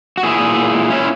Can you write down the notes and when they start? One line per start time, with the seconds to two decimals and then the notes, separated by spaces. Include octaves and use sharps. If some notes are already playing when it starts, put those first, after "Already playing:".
0.18 F#4
0.23 A#2 E4 G#4
0.40 A#2
0.56 A#2
0.74 A#2
0.90 C#4 E4